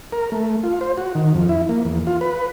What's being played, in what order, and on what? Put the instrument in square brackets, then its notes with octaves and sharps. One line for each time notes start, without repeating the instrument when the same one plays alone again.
[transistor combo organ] A#4
A3
F4
C5
F#4
D#3
F2
E4
A#3
E2
F4
B4